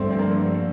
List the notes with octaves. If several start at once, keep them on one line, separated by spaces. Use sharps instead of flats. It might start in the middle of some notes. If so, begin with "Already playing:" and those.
Already playing: G2 D3 F3 A3 C4
C4
A#3